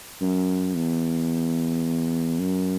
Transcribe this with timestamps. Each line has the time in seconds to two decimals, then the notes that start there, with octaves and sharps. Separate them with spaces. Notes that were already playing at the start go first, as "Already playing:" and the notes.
0.21 F#2
0.76 E2
2.40 F#2